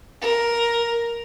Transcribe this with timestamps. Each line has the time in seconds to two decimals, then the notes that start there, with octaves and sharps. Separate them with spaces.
0.21 A#4